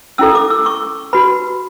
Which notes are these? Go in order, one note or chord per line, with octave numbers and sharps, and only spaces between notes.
C#4 E4 A4 E6
D6
E6
C#6
F#4 B4 B5